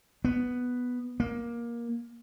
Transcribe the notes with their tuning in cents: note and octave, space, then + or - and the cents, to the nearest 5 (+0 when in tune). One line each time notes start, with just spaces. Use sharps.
B3 +0
A#3 +15